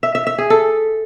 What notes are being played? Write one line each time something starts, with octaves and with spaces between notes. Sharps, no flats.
E5
E5
E5
G#4
A4